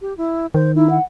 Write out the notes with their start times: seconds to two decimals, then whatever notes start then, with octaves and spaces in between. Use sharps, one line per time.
0.01 G4
0.17 E4
0.54 D#3 C5
0.76 D#4 E4
0.90 F#5